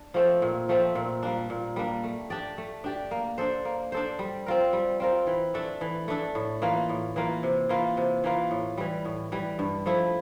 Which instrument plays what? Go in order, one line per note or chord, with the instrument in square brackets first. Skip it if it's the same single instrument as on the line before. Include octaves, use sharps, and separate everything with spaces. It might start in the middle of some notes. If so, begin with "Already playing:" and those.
Already playing: [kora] D4
F3 A3 C4
A#2
F3 A3 C4
A#2
G3 A#3 D4
A#2
G3 A#3 D4
A3
D4 G4 D5
A3
D4 G4 D5
A#3
D4 A4 C5
A#3
D4 A4 C5
G3
C4 F4 A#4
G3
C4 F4 A#4
E3
A3 D4 A4
E3
A3 D4 A4
A2
E3 A#3 F4
A2
E3 A#3 F4
C3
E3 A#3 F4
C3
E3 A#3 F4
A2
E3 G3
A2
E3 G3
G2
F3 A3 E4